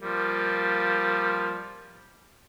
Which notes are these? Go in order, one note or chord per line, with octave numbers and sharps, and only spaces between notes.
F3 G3 A#3